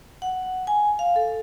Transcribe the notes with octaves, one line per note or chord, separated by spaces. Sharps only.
F#5
G#5
F5
A4